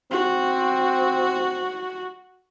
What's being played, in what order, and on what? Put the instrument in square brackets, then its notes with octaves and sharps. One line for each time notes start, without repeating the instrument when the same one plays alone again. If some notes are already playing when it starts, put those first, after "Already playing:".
[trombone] C4 [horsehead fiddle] F#4